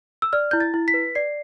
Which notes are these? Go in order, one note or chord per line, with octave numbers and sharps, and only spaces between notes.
E6
D5 F6
E4 G6
A6
E4
B6
B4
D5 C7